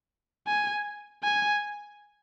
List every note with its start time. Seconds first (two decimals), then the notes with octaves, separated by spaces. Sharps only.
0.47 G#5
1.24 G#5